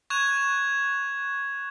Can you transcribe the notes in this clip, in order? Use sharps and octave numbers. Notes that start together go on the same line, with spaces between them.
C#6 F#6 G#6 E7 F7